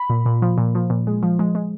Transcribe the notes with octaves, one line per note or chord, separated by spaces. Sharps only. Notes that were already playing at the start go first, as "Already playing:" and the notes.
Already playing: B5
A#2
A#2
F3
A#2
F3
A#2
G#3
F3
G#3
G#3